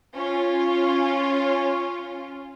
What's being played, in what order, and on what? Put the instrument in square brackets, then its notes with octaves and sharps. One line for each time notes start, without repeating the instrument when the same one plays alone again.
[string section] C#4 F4